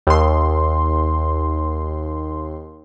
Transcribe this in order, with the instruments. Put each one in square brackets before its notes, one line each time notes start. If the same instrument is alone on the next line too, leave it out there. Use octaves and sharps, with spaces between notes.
[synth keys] D#2 C6